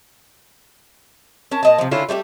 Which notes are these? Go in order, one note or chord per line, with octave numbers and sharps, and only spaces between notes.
C#4 A#4 A5
A#2 D#5 A5
C3 F3
D3 C#4 E4 F4
G3 A3 F#4 G4